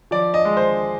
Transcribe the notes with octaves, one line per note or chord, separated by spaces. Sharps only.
F3 D5
D#5
G#3
C5